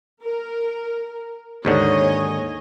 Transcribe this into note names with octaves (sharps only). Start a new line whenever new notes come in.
A#4
D#2 G#2 D3 C#5 D#5 G#5